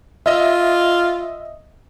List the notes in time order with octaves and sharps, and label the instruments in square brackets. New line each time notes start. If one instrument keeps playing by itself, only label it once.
[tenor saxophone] F4 [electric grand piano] D#5 E5